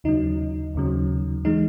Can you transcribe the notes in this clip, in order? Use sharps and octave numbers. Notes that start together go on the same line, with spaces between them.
D#2 C#3 F#3 D#4
D#2 C#3 F#3
E3 G#3 D#4